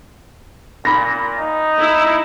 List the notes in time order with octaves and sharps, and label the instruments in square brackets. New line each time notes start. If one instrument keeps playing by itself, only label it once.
[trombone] A#2 [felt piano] B5 A#6
[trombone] D#4
[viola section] E4